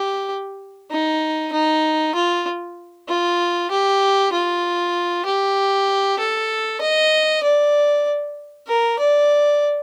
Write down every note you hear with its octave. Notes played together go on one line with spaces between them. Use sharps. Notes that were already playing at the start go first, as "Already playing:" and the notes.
Already playing: G4
D#4
D#4
F4
F4
G4
F4
G4
A4
D#5
D5
A#4
D5